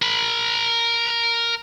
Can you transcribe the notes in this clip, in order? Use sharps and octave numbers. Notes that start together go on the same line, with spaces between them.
A#4 B5